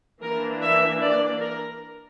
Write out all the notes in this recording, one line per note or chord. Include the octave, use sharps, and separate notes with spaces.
E3 A#3 D4 A#4
E5
D5
A#4